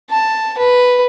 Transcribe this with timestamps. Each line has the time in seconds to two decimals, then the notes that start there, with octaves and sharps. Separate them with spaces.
0.10 A5
0.58 B4